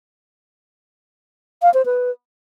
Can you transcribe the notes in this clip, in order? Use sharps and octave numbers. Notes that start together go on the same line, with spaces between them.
F5
C5
B4